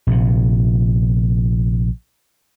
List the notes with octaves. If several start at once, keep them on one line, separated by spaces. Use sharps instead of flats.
A#1 C3